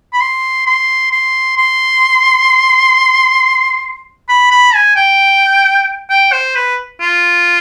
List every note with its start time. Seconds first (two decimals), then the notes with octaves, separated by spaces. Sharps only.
0.13 B5
0.21 C6
0.67 C6
1.12 C6
1.57 C6
4.29 B5
4.51 B5
4.74 G#5
4.96 G5
6.10 G5
6.33 C5
6.55 B4
7.01 F4